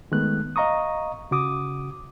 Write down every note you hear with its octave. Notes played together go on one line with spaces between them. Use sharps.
D#3 G#3 A3 B3 F#6
D#5 F5 A#5 C#6 D#6
C#3 F#4 D6 D#6